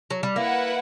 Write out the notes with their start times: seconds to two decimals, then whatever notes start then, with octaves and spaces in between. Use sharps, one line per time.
0.10 F#3
0.23 G3
0.36 A#3 E4 B4 F#5